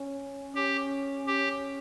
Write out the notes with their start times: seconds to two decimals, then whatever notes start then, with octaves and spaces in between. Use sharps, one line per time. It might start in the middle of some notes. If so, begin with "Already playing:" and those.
Already playing: C#4
0.54 C#4 G4
1.27 C#4 G4